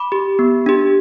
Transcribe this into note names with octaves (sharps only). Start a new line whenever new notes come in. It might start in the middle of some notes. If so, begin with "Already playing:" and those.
Already playing: B5 D6
G4
B3
D4 G4